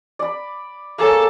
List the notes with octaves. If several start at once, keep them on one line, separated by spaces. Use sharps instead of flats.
D5 B5
A#3 G#4 A4 C#5